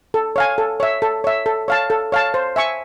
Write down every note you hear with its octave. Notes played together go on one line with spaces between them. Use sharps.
A4
C#5 F5 G#5
A4
C#5 E5
A4
C#5 E5
A4
C#5 F5 A5
A4
C#5 F5 A5
C5
E5 G#5 C#6